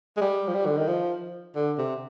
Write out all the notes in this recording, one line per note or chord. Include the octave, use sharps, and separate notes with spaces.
G#3
G3
F3
G3
D3
D#3
F3
D3
C3